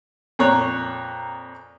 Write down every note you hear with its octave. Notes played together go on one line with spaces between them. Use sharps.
F2 A#2 C#5 A#5 F#6